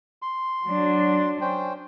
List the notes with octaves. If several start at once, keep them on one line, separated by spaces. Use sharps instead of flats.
C6
F#3 D4
C#4 C5 G5